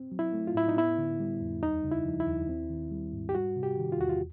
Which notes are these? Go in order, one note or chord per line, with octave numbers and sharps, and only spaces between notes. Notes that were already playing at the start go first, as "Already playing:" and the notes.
Already playing: C4
F#3
E4
A3
F4
A2 E4
D#4
B3 E4
D3
G3
F2
D#2 D#4
C#3
E4
F3
E4
D#2
C4
D#3
G3
G#2
G4
G3 F#4
C3
G4
D#3
F4
E2 F#4
F4